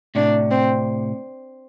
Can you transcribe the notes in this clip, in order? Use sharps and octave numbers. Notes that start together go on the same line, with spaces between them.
A2 C3 D4
C4